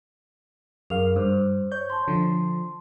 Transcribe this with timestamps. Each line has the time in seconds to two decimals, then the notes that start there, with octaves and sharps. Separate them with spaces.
0.90 F#2 G#4 A#4 F5 F7
1.16 G2 C5
1.72 C#5 G6
1.90 A5 C6
2.08 D3 F3